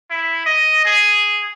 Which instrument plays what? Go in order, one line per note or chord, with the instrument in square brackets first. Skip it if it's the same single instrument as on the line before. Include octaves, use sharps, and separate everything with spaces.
[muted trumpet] E4
D#5
G#4